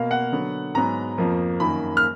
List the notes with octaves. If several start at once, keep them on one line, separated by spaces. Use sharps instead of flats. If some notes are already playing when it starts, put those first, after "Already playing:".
Already playing: B2 A#3 F5
F#5
D3 F#3 B3
G#2 F#3 B3 A#5
F2 F3 A#3
F#2 D#3 A#3 B5
F6